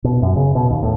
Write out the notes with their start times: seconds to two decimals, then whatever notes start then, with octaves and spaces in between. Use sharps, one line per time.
0.04 B2
0.22 F#2
0.36 C#3
0.55 B2
0.70 D#2
0.83 A2